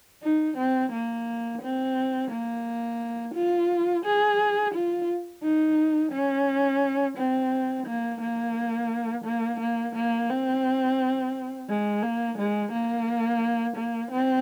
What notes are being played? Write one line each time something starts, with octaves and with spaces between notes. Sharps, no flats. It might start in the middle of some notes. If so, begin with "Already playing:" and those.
D#4
C4
A#3
C4
A#3
F4
G#4
F4
D#4
C#4
C4
A#3
A#3
A#3
A#3
A#3
C4
G#3
A#3
G#3
A#3
A#3
C4